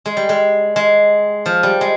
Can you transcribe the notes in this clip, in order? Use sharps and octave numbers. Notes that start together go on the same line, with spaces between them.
G#3
G3
G#3
G#3
F3
G3
G#3